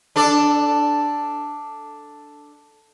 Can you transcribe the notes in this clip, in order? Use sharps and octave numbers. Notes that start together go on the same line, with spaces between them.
D4 A4 D5